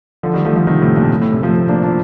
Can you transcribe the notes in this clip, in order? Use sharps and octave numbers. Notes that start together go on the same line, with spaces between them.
D3 F3
D#3 G3
F3 A3
D3 F3
C3 D#3
A2 C3
G2 A#2
A2
A2
A2 C3
F3 A3
A3 C4
A#3 D4
D4 F4